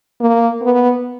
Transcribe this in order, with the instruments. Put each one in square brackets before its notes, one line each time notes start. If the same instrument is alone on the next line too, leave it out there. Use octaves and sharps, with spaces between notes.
[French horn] A#3
B3